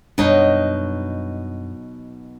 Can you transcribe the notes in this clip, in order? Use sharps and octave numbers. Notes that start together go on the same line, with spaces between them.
F#2 B2 F#3 G3 D4 D#4